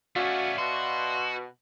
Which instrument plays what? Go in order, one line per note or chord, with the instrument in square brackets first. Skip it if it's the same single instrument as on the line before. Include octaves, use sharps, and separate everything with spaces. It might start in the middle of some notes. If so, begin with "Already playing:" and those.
[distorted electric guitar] A3 B3 [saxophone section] C#4 [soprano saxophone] F#4 [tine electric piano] D5 E5 F5
[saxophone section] B2 [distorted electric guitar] F#4 [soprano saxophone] C6